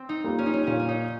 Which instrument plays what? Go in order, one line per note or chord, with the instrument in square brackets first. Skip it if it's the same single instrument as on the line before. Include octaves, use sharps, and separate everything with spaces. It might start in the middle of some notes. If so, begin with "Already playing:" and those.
Already playing: [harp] C4
D#4
[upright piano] G3 A#3 F4
[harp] C#4
D#4
C#4
[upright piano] A#2 [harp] C#4
[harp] C#4
D#4